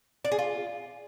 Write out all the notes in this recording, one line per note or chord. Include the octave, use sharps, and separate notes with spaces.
D5
G#4
F4